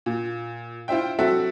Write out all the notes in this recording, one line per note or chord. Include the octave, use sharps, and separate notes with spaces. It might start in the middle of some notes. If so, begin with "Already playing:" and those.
A#2
E4 F4 C5 E5 G5
F#3 C4 F#4 A4 E5